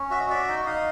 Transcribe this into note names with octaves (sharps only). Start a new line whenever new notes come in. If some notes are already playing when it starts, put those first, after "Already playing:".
Already playing: C#4
F#4 E5
D#5
F#4 D5 E5
D#4
D#4 D#5 F5